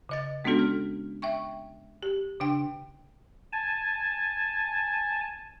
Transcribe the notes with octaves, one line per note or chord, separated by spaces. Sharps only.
C#3 D#5 A6
G#3 B3 C#4 D4 F#4 A4
F6
E5 G5 C#6
G4
C#3 D4 G5
G#5 A5